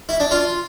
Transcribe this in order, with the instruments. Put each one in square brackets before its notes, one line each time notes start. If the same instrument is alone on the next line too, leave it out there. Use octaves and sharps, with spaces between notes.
[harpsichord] E4
D4
F4